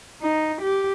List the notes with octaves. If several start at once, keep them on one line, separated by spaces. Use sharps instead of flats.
D#4
G4